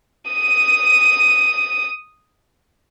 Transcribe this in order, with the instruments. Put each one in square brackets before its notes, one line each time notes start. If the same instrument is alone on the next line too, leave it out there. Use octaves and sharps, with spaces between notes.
[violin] D#6 D#7